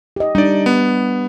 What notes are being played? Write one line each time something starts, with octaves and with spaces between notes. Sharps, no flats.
G4 D#5
G3 D4 D#4 D5
B3